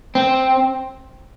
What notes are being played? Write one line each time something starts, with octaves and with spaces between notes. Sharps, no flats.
C4